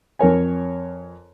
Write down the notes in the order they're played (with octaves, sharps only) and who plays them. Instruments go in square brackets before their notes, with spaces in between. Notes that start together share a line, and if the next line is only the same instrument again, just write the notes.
[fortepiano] F2 A#4 C#5 G#5